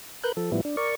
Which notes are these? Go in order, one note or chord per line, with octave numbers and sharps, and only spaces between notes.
A#4 B4 F#6 G6
F3 A4
A2 F3 G3 B3 E4
D4
A#4 D5 C#6